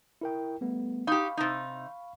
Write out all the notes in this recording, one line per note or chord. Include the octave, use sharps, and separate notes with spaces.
E4 A#4 G5
G3 A3 B3
D#4 G4 F5 B5 C#6
C3 D#4